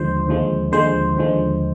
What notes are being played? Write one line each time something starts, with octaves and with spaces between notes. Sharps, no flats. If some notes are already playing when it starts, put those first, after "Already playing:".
Already playing: D#2 D3 F3 G#3 C5
D#2 D3 F3 G#3
D#2 D3 F3 G#3 C5
D#2 D3 F3 G#3